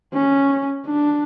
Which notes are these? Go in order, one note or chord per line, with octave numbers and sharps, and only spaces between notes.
C#4
D4